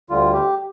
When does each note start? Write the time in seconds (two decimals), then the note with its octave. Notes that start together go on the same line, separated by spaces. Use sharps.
0.10 D2 D3 G3 F4
0.33 G4